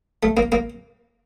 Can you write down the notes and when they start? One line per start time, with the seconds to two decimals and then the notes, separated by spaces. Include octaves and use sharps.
0.23 A3
0.37 A#3
0.52 A#3